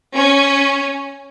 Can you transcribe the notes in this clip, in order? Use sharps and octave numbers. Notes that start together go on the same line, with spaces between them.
C#4